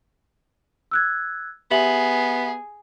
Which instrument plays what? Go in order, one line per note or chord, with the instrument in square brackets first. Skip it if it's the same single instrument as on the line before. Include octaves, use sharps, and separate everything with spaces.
[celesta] E6 F#6 G#6
[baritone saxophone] B3 [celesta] G4 E5 F#7 [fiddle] G#4